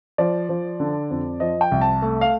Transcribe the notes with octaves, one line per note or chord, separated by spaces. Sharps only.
F3 D5
F3
D3
F2
F3 D#5
G5
C2
A5
A3
F5